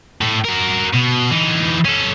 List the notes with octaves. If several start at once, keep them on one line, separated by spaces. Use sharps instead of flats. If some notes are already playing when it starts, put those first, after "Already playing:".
A2
F#4 A#4
B2
E3 D#4
C#4 A4